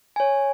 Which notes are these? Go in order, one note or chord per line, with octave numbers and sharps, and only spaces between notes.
C#5 G#5